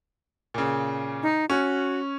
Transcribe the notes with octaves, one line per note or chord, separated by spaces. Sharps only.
A#2 C#3
D#4
C#4 F#4